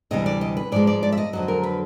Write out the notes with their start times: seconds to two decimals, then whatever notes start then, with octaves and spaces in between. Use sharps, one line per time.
0.11 D2 C3 E3 G3 D#5
0.26 D5
0.41 D#5
0.57 B4
0.72 G#2 F3 G#3 D5
0.87 D5
1.03 D5
1.12 E5
1.18 D#5
1.33 F2 D3 F#3 D#5
1.48 A#4
1.63 B4